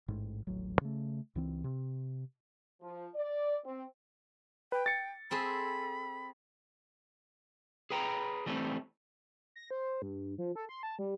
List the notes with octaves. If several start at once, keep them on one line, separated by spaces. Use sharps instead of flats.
A1 G#2
D#1 A1 F#3
C#3 A3
C#2 E3 C4
C3
F3
D5
C4
B4 G5
A6 C#7
C4 G#4 A4 B5
G#4 B4 G5 A5 A#5
E3 G3 A3 A#3 C4
A#6
C5
G2
F3
A4
C6
A5
G3